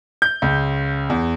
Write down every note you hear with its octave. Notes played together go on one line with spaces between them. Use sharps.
G6
C#2
E2